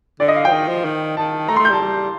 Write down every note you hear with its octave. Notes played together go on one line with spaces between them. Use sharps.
D3 D5
D#5
F5
F3 G5
D#3
F3
D#3
D#3 A5
A3 A#5
C6
A3
G6
G3
A5
G3